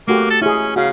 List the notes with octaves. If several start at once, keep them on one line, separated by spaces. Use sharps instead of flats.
A3 A#3 F#4 G4
A4
C#4 E4 G#4
C#3 F#4 F5